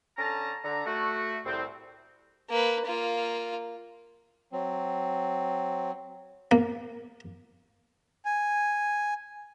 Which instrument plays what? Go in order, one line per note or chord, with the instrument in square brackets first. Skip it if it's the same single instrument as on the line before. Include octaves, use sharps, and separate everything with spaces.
[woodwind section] D3 C#4 A4 A5 A#5
D3 A#5
A3 F#4
C2 A2 C4
[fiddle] A#3 B4
A#3 F4
[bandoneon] F#3 C4
[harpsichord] A#3
[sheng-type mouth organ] G#5